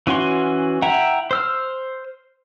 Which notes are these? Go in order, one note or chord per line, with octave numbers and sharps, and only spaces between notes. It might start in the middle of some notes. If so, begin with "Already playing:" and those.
E3 C#4 F#4 C6
E4 E5 F#5 G5 A#5
C5 E6 F6